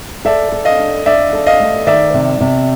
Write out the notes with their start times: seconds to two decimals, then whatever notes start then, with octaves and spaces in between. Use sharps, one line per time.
0.25 A4 D5 E5
0.52 A4
0.65 D#5 F5
0.79 D4
1.06 D4 D5 E5
1.33 A4
1.46 D#5 F5
1.60 A3
1.87 D#3 D5 E5
2.14 C3
2.41 C3